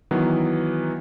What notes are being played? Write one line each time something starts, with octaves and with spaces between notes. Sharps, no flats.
D#3 E3 F#3 B3